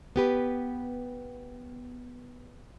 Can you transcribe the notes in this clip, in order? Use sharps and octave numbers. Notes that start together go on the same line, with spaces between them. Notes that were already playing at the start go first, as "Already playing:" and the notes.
B3 G4 B4